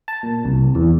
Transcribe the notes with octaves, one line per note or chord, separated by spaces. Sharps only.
A5
A#2
C2
E2